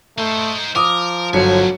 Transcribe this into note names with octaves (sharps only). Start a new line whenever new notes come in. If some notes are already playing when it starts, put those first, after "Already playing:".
A3 D#4 C5
F3 A#4 D6 D#6
G1 G2 F#3 G#5 C#7